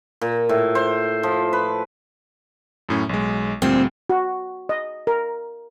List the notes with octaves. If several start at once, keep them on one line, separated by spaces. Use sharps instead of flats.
A#2
A2
C5
F3
B4
F#2 A2 C#4
B1 G#3
D2 A#2 G3 C4
F#4
D#5
A#4